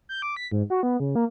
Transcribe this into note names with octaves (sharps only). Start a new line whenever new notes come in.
G6
D6
B6
G#2
F#4
B3
C#3
A#3